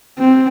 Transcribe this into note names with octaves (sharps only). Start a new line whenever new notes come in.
C4